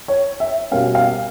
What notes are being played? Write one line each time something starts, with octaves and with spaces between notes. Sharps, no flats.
C#5
E5
B2 G3 A#3 C#4 F5
F5